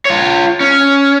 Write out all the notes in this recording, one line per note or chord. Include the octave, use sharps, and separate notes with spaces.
F4 C#5
C#4